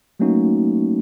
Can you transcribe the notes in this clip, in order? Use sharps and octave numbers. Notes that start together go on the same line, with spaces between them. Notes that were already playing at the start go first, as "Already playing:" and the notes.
F#3 A3 A#3 C#4 D#4 F#4